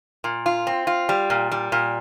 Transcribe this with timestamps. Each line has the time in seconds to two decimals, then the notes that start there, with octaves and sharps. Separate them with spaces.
0.24 A#2
0.46 F4
0.67 C4
0.87 F4
1.09 G3
1.30 A#2
1.52 G3
1.72 A#2